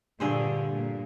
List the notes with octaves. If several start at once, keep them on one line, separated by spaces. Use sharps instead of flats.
G2 A#2 D3 G#4 C5
A#2